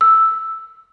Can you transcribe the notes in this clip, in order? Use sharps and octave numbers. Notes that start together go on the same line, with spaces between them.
E6